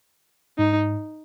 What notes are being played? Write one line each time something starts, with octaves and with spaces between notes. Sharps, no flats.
G#2 D#4